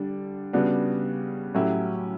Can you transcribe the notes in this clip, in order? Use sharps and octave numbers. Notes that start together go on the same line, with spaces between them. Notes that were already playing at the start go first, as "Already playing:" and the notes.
Already playing: D3 G3 D4
C#3 G3 B3 D4 F#4
A2 F#3 C#4 E4 G4